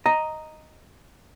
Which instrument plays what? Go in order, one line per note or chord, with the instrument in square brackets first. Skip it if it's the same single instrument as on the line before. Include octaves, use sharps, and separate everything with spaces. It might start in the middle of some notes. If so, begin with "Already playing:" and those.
[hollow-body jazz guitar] D#5 A#5